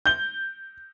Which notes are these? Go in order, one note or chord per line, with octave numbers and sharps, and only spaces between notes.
G6 G7